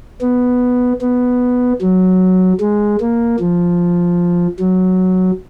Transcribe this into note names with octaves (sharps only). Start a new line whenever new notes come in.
B3
B3
F#3
G#3
A#3
F3
F#3